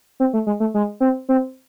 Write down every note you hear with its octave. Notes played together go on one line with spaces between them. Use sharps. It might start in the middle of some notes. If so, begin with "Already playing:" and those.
C4
A3
G#3
A3
G#3
C4
C4